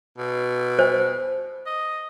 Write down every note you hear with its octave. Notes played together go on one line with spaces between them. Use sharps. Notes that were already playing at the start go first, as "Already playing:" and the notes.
B2
C5
D#5